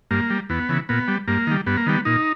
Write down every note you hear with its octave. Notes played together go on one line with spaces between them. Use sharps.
G2 A#3
G3
E2 B3
C#3 E3
A#2 B3
G3
G2 A#3
D#3 G3
G2 B3
A#3
D#3 G3 B3
A#2 D#4